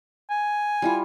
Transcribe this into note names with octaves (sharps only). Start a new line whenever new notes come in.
G#5
G3 E4 F4